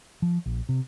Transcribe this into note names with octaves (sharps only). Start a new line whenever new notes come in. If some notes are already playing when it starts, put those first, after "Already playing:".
F3
A#1
C3